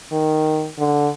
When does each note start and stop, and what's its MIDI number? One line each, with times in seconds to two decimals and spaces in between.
0.12 0.68 51
0.78 1.10 50